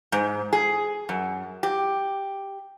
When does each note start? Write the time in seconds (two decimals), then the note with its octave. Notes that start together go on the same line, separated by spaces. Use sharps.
0.12 G#2
0.53 G#4
1.09 F#2
1.63 G4